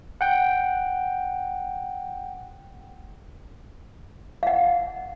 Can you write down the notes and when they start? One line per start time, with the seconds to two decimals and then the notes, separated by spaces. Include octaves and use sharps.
0.21 F#5 G5
4.43 F5 F#5